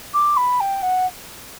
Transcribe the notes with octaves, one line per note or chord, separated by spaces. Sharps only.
D6
B5
G5
F#5